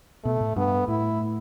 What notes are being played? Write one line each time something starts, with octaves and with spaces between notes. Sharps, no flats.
B2 A3
A2
G2 B3
A2 E4